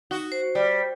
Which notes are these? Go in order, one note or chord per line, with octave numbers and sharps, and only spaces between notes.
D#4 F#4
C5
G3